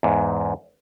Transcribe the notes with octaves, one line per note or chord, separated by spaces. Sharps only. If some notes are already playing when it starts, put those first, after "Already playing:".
E2 G#2